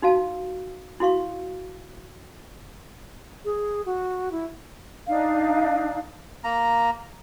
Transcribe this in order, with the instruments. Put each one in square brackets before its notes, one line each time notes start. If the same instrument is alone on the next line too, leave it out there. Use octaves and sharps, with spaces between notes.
[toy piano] D#4 F#4 F5 A5
E4 F#4 F5 C#6
[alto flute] G#4
F#4
E4
[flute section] D4 D#4 F5
[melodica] A#3 A#5